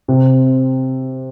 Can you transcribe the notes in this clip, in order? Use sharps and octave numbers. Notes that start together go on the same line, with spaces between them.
C3